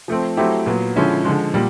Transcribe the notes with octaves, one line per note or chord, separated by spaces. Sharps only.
F3 A3 C4
F#3 A3 C4 E4 G4
A#2 F#3 B3
D3 F3 G#3 C#4 E4
D3 F3 G#3
A#2 G3